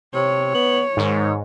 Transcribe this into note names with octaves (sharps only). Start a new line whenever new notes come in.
C3 C#5
B3
G#2 D#3